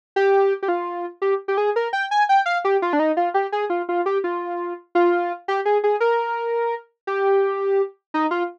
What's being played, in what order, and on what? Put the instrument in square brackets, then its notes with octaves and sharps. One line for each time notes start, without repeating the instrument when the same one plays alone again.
[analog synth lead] G4
G4
F4
G4
G4
G#4
A#4
G5
G#5
G5
F5
G4
F4
D4
D#4
F4
G4
G#4
F4
F4
G4
F4
F4
G4
G#4
G#4
A#4
G4
D#4
F4